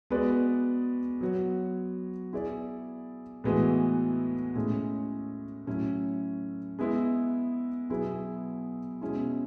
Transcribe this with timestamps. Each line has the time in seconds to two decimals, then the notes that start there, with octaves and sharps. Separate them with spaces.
0.10 G#3 B3 F#4 B4 D5
1.21 F#3 B3 F#4 C#5
2.33 B3 E4 G#4 D5
3.44 A2 E3 G#3 B3 F#4
4.55 A2 G#3 C#4
5.66 A2 F#3 C#4 E4
6.79 G#3 B3 E4
7.89 B2 F#3 B3 E4 G#4
9.01 B2 G#3 C#4 E4